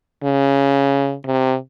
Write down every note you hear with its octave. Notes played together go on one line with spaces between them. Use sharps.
C#3
C3